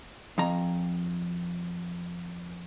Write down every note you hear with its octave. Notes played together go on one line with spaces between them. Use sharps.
F2 A#5